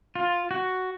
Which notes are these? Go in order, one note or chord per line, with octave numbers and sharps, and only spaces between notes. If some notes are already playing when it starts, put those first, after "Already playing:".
F4
F#4